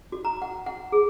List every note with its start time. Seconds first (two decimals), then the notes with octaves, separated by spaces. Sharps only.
0.12 F#4
0.25 A#5
0.42 F#5
0.66 F#5
0.92 G#4